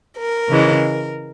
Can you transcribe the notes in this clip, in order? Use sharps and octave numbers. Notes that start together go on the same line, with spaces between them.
A#4
C#3 E3 G#3